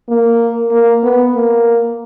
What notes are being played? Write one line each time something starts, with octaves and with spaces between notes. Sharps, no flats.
A#3
A#3
B3
A#3